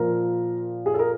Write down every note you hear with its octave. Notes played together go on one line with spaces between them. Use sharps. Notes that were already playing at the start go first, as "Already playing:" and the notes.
Already playing: A#2 F3 A#4
G#4
A4
A#4